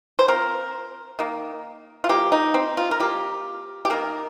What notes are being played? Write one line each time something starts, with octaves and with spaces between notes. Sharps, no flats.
C5
F3 C4 A#4
D#3 A#3
F4
F3 A#3 G4
D#4
C4
F4
A#4
F3 A#3 G4
G4
D#3 A#3 A#4